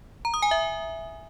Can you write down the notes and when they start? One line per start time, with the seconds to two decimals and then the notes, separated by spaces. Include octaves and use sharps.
0.25 A#5
0.34 D#6
0.42 G#5
0.51 E5